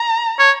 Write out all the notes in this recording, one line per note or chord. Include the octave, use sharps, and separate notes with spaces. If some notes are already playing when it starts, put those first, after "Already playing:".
Already playing: A#5
C#5